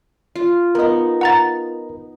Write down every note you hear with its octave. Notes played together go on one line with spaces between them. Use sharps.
F4
B3 D#4 A#4 D#5
F#5 A#5 A6